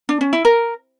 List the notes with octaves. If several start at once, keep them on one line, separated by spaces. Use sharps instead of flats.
D4
C#4
E4
A#4